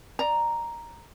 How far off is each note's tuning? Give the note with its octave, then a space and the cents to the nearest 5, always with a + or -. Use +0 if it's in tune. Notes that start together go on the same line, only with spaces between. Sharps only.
D5 +15 A#5 +0